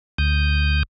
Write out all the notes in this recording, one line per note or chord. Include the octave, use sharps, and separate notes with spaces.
D2 D#6 G6